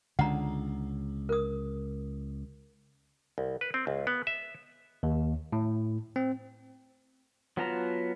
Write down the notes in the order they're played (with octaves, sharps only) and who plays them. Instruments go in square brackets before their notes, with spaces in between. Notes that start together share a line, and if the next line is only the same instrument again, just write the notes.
[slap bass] C#2 [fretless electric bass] D3 [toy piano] F#5 A#5
[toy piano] A#4 D#6
[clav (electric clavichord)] C2
B4
C4
C#2
B3
E5
[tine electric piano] D#2
A2
C4
[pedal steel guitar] F#3 B3 F4 A5 A#5